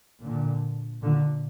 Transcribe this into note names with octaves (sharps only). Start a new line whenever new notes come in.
A#2 D3
A#2 D3